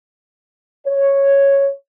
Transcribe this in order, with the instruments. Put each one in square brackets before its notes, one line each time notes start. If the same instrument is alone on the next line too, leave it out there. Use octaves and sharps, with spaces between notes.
[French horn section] C#5